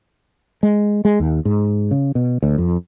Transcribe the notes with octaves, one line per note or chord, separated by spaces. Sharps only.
G#3
G#3
D#2
G#2
C#3
B2
D2
F2